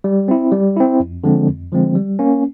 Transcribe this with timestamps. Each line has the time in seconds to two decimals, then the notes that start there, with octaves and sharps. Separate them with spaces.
0.04 G3
0.28 C4 E4
0.52 G3
0.76 C4 E4
1.00 F2
1.24 D3 F3 G#3 C4
1.48 F2
1.72 D3 F3 G#3 C4
1.95 G3
2.19 A#3 C#4